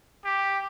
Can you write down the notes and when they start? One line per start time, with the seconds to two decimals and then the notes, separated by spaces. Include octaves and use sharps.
0.25 G4